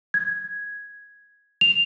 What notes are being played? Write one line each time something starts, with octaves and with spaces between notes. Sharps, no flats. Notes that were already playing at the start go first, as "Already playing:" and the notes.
G#6
F7